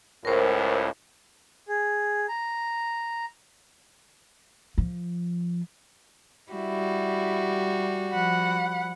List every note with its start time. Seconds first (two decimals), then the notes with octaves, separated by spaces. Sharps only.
0.25 C#2 A2 A#4 C5
1.67 G#4
2.28 A#5
4.78 F3
6.52 G3 E4 F#4
8.11 F3 F#5 B5